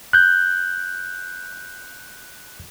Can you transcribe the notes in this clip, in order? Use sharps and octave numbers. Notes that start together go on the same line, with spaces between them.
F#6 G6